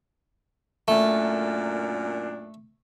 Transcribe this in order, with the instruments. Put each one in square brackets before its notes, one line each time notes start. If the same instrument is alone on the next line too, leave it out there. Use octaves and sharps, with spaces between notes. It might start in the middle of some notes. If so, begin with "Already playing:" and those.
[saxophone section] F#2 A#2 D4 [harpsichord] A3